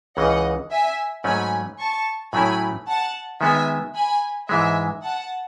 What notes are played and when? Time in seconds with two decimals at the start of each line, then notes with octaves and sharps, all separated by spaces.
0.17 C#2 C#3 E3 D#5 F#5
0.71 E5 G#5
1.24 G#2 F#3 A3 C#4 G#5 B5
1.79 A5 C#6
2.33 A2 F#3 A3 C#4 E4 G#5 B5
2.88 F#5 A5
3.41 D#3 G#3 B3 E5 G#5
3.95 G#5 B5
4.49 G#2 E3 G#3 E5 G#5
5.03 F#5 A5